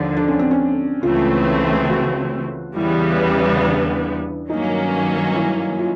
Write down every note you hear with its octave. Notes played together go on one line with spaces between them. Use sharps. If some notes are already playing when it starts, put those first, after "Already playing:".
Already playing: D#2 D3 F3
D4
C#4
C4
C#4
C#2 C#3 E3 A3 C4 F4
F#4
E2 C#3 E3 G3 B3 E4
D4
G2 D#3 F#3 A#3 C#4 D#4
E4
F4